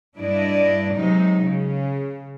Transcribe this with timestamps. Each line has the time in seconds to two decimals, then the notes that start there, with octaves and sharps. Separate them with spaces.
0.17 G2 D4 E4 D5 D#5
0.93 C3 F#3 G#3 D#4
1.43 C#3